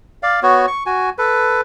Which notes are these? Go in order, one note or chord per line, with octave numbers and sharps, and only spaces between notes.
D5 F5
B3 F#4 C#5
C#6
F#4 G#5
A4 B4